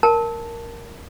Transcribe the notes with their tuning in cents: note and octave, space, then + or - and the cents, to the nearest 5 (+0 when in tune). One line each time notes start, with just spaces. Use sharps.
A#4 +0 A5 +0